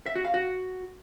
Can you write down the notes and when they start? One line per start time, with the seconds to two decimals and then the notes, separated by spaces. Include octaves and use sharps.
0.06 E5
0.15 F#4
0.25 F5
0.34 F#4